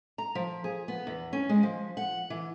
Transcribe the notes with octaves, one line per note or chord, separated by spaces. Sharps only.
A#5
F3
G#4
B3
E2
C#4
G#3
F3
F#5
E3